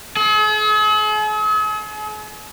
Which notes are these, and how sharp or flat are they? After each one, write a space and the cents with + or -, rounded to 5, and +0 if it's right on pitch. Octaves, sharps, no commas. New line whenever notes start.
G#4 +45